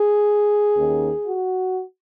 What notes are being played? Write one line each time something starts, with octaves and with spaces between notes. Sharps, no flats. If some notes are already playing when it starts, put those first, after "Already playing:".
Already playing: G#4
D#2 D#3 A#3 C#4
F#4